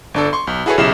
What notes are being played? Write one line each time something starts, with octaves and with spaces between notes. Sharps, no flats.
G1 D4 A4
C6 C#6
B1
E4 F#4 G#4 A4 B4 C#5
B1 C#3 E4 G4 C7 E7